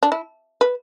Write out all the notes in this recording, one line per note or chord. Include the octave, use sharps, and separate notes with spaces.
D4
E4
B4